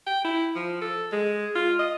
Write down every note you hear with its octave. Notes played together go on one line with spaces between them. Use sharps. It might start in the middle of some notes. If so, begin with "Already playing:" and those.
G5
E4
F3
A4
G#3
F4
D#5